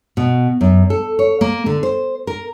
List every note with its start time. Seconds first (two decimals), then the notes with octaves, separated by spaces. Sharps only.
0.17 B2
0.61 F#2
0.90 A4
1.19 C#5
1.41 A#3
1.66 D3
1.83 C5
2.27 A#4